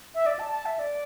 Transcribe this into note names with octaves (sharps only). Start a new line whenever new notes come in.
E5
D5
A5
A5
E5
D5